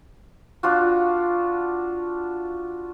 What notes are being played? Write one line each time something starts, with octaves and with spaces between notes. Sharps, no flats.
D4 F4 F#4